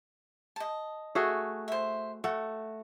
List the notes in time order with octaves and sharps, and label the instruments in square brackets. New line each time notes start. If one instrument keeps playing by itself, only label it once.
[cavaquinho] D#5 A5
[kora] A3 F#4 G#4
[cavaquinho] C5 E5
[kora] A3 [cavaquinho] F#4